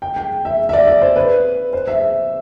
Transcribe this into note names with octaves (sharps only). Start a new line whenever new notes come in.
G5
G5
E5
E5
D5
D5
C5
B4
C5
E5